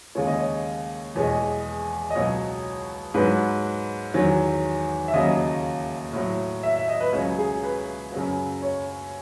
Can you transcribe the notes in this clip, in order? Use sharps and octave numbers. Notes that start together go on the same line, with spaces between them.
D#2 C#3 G#3 C#5
D#5
C#5
E2 B2 G#3 C#5
D#5
C#5
D#5
C#2 B2 F#3 C#5
G#2 F#3 B4
E2 D#3 F#3
E5
D#2 C#3 F#3 D#5
A2 F#3
E5
E5
D#5
B4
C#2 C#3 F#3 C#5
G#4
B4
F#2 C#3 F#3
C#5